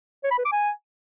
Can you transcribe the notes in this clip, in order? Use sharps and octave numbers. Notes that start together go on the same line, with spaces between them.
C#5
B5
B4
D6
G#5